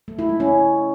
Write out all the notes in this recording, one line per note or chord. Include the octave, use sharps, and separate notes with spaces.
A3
E4
G#3
C#4